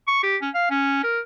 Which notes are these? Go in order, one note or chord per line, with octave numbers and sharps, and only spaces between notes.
C#6
G4
C#4
F5
C#4
A#4